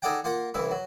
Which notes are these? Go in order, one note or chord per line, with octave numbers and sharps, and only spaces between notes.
D#4 G#4 A4 D5 F#5 G5
A#3 F4 F#5
C2 C#3 E3 E5
F#3